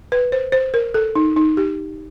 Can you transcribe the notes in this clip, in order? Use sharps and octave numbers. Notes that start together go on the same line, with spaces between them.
B4
C5
C5
A#4
A4
D#4
D#4
G4